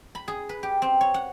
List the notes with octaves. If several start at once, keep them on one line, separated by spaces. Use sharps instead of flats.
B5
G#4
B4
G4
C4
C#5
F#5